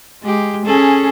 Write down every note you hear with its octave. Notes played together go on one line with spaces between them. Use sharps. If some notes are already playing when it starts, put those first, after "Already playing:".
G#3 G4
C#4 G#4 A4